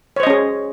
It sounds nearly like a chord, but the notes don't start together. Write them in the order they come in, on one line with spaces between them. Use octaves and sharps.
C#5 C5 D#5 C#4 G#4